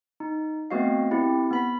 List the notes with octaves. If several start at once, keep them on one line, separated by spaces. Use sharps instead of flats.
D#4
A3 B3 C4 F#4 D#5 F5
C4 E4 G4
B3 B5 B6